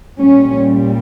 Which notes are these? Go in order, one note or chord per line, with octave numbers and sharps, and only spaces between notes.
A#2 G3 C#4